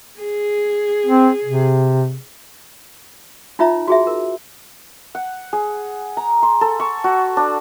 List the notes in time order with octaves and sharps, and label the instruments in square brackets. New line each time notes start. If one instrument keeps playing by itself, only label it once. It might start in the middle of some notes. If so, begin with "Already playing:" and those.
[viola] G#4
[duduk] C4
C3
[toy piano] D#4 F4 C#5 E5 A#5
F#4 G#4 E5
A#4
[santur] F#5
G#4
A#5
C6
A4
C#6
F#4
D4